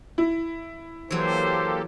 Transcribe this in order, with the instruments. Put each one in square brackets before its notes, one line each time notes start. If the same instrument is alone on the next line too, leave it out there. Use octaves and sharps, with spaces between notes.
[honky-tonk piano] E4
[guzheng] E3 F#3 [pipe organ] A#3 G4 A4 [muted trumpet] C5